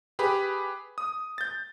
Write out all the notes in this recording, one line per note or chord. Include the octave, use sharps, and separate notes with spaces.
G4 G#4 B4 B5
D#6
G6 A6